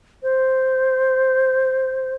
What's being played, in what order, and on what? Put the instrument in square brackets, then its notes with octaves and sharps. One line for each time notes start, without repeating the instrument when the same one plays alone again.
[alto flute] C5